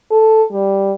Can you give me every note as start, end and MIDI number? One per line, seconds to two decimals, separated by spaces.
0.11 0.44 69
0.53 0.92 55